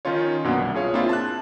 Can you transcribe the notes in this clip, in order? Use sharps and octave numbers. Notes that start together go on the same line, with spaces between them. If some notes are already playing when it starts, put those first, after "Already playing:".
D#3 C#4 D#4 F4 C#5
F#2 B2 A#3 B3 D4
C2
F4 G#4 C#5 F5
A#3 C4 D4 E4 F4
A5 F#6